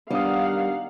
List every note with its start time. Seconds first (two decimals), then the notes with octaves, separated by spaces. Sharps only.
0.10 D#3 G3 B3 D4 F5 F#5 D#6